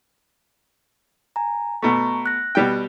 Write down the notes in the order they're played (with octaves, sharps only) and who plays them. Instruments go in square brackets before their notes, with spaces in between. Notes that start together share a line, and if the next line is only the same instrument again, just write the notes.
[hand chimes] G#5 A#5
[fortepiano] B2 A3 [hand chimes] A#5 C#6
[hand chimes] F#6 A#6
[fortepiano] B2 G3 G5